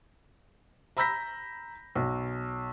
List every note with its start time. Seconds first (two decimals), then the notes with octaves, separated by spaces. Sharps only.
0.97 A#5 B5 E6 G6 A#6 B6
1.95 B1